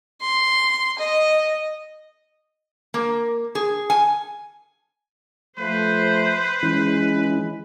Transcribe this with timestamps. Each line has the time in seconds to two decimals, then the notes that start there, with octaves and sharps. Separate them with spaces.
0.21 C6
0.99 D#5
2.94 A#3
3.55 G#4
3.90 G#5
5.58 F3 A3 B4 C5
6.63 E3 G#3 C#4 E4